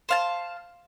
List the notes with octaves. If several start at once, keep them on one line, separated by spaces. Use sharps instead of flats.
C5 F5 A5